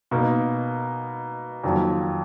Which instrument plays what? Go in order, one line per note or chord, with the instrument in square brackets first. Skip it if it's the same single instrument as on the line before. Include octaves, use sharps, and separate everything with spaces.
[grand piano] B2 A#3 D#4 A#4
F2 D#3 F#3 A#3